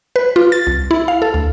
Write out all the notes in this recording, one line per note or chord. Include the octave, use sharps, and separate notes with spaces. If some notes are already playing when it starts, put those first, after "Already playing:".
B4
F4
A6
C2
E4
F5
A4
D2